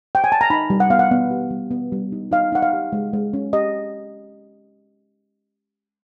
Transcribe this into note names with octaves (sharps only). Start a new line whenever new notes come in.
G5
G#5
A5
A#5
D#4 B5
G3
F#5
B3 F5
F#5
B3
G4
G3
B3
G3
D#4
D#4 F5
D#4 F#5
F5
G4
G#3
G#3
C#4
G4 D#5